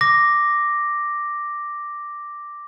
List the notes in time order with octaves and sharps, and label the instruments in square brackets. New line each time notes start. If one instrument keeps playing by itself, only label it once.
[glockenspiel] D6 A#6